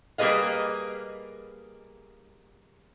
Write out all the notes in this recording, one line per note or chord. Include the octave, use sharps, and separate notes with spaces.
G3 A#3 G#4 B4 D#5 F5